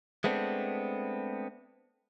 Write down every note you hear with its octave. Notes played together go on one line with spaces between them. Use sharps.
G#3 A3 B3 C4 D4